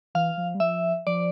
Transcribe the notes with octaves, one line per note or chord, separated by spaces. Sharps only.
E3 F5
F3
G3
F3 E5
F3 D5